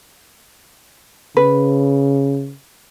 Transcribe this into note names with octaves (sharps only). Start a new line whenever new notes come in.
C#3 B4